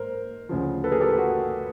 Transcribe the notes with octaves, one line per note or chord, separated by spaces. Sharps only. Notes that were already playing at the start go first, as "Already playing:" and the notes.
Already playing: G#2 A#4 C5
D2 C#3 F3
A4 B4
G#4 A#4
G4 A4
F#4 G#4